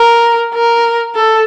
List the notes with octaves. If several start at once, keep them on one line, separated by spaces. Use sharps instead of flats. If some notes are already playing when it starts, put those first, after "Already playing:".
Already playing: A#4
A#4
A4